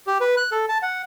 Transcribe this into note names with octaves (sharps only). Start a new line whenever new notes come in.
G4
B4
F#6
A4
A5
F#5